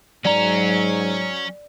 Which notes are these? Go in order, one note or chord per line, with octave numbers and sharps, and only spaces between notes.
G#2 F#3 C#4 D5 A#5 F7